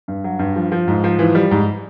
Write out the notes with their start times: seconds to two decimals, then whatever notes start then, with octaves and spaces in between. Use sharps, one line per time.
0.08 G2
0.24 F#3
0.39 G2
0.56 F3
0.72 F3
0.88 G#2
1.04 F3
1.19 E3
1.35 G3
1.51 G#2